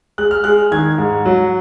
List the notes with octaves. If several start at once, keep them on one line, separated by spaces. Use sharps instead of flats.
G#3 F#6
F6
G#3 F#6
D#3 G#6
G#2
F#3